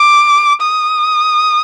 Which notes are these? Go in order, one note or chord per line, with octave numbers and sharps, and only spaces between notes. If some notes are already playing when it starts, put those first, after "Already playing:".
Already playing: D6
D#6